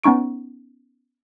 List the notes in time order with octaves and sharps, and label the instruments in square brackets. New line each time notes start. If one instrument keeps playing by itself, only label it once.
[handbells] B3 C#4 D#4 C#6 D7